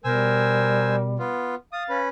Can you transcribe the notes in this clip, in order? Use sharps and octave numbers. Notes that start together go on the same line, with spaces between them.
B2 G3 A#4 C5 G#5 E6
B3 F4
F5 D#6 A6
C#4 B4